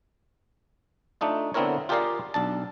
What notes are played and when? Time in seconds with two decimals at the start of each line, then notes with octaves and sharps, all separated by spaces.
1.21 A3 D4 D#4 F4
1.54 D3 B3 C4 E4 A#4 C#5
1.89 F4 G4 G#4 A#4 D5 F5
2.34 B1 D4 A5